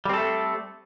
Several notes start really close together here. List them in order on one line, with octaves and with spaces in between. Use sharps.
G3 C4 A4 A3